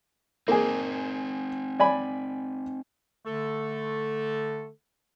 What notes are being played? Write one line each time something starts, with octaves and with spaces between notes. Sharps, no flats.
A#3 C4 D#4 G#4
D5 G#5 B5
D3 A3 A4